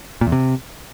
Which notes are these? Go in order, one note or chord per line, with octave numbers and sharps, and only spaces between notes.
A#2
E2
C3